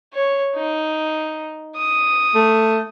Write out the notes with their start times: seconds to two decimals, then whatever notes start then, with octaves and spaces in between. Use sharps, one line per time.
0.14 C#5
0.55 D#4
1.76 D#6
2.35 A3